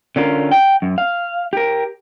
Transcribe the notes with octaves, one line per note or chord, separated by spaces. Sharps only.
D3 C#4 F4 A#4
G5
F#2
F5
G4 A#4